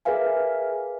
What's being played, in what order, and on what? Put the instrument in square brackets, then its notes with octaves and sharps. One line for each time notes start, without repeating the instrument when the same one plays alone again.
[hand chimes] G#4 A#4 B4 E5 F5 G#5